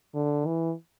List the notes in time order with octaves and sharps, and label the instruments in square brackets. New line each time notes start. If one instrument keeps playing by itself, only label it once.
[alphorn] D3
E3